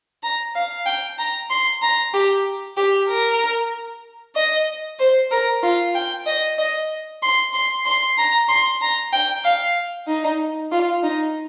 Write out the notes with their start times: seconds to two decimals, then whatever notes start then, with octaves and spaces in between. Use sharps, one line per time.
0.23 A#5
0.55 F5
0.86 G5
1.18 A#5
1.50 C6
1.82 A#5
2.13 G4
2.77 G4
3.09 A#4
4.36 D#5
4.99 C5
5.31 A#4
5.62 F4
5.95 G5
6.27 D#5
6.58 D#5
7.22 C6
7.54 C6
7.85 C6
8.18 A#5
8.49 C6
8.81 A#5
9.13 G5
9.45 F5
10.08 D#4
10.72 F4
11.03 D#4